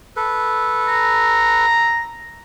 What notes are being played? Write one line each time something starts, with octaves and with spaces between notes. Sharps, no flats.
A4 B4
A#5